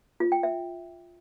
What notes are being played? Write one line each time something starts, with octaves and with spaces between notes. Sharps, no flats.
F4
G5
E5